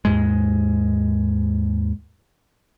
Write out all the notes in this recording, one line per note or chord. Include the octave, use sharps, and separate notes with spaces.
D#2 G#2 G#3